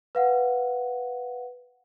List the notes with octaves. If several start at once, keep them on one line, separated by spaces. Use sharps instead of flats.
B4 F5 F#5